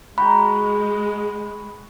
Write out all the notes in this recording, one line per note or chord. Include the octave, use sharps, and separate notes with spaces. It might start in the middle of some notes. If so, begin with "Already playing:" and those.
G#3 F#4 G5 A#5 B5